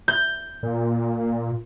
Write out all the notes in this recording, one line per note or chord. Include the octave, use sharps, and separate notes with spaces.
G6
A#2